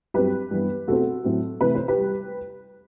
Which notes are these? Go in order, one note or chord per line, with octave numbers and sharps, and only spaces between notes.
G2 F#3 C4 G4 B4
G2 E3 B3
B2 A3 C4 F#4 A4
A2 F#3 C4
C3 E3 A3 C4 B4
C5
G4 B4
G3